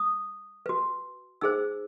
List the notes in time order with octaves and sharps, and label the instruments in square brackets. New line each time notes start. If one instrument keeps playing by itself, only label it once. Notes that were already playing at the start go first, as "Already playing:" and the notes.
Already playing: [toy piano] D#6
F#4 B4
D#4 G#4 C5 E6